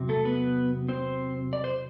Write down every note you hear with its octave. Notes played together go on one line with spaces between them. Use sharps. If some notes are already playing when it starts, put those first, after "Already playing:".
Already playing: E2 C3 F#3
A3 A4
B3 B4
C4 C5
D5
C5